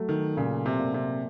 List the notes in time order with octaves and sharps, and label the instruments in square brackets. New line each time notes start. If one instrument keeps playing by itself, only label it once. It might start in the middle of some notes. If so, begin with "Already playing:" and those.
Already playing: [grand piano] F#3 A3
[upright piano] D#3
[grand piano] A#2 [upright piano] C#3
[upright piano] C3
[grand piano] A#2
[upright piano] C3